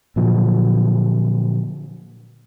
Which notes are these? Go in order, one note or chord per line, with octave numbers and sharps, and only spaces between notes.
A#2 D3 F3 F#3